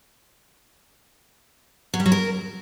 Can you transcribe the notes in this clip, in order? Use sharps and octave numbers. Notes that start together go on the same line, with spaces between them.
F#3
G3
F#3
A#4